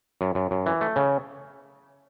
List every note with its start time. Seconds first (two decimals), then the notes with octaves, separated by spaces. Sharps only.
0.21 F#2
0.35 F#2
0.51 F#2
0.66 E3
0.81 A3
0.96 C#3